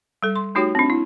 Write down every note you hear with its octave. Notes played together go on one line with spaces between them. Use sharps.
G3 A4
C6
A3 D#4 F#4 G4 C#5 G5
C4 D4
E4